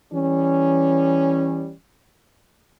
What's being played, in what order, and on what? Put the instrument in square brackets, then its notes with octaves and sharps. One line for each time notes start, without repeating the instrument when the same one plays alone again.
[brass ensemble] E3 G3 C#4